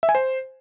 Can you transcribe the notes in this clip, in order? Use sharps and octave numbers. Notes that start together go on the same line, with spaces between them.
E5
G#5
C5